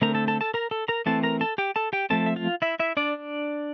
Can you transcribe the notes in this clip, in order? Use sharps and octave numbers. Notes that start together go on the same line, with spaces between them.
D3 A3 C4 A#4 A#5
A4 A5
A4 A5
A4 A5
A#4 A#5
A4 A5
A#4 A#5
E3 A3 C4 A4 A5
A#4 A#5
A4 A5
G4 G5
A4 A5
G4 G5
F3 A3 C4 A4 A5
E5
F4 F5
E4 E5
E4 E5
D4 D5